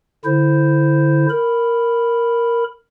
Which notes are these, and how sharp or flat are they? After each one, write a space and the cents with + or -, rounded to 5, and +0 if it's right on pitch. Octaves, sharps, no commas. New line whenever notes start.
D3 +0 E4 +5 C5 -5
A#4 +0 B5 +0